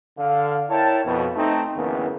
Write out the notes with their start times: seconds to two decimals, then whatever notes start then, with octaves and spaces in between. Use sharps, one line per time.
0.18 D3 F5
0.70 E4 A#4 C#5 G5 A5
1.05 F2 B2
1.35 A3 C4 D#4
1.76 F#1 D2 C#3 E3 A#3 B3